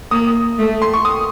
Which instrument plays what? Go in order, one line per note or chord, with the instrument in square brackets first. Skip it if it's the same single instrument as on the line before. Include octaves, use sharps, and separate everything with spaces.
[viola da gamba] A#3 [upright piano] D#6
[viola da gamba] A3
[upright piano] C6
C#6
D#6